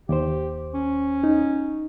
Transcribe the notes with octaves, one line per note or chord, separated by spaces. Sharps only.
D#2 G4 C5
C#4
D#4